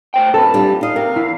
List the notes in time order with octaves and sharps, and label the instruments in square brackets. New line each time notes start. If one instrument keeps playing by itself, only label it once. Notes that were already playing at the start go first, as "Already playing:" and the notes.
[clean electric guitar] A2 C5 G5
[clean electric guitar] F#2 C3 [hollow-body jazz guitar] A4 B4 [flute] A5
[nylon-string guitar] G3 D4 F4
[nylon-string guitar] D#4 D#5 [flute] F5
[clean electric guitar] C3 [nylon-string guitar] A#4
[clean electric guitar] E2 [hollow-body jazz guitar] E4